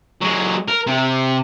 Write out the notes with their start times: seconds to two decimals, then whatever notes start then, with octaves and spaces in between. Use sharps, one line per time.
0.21 F#3 G#3
0.68 A#4
0.87 C3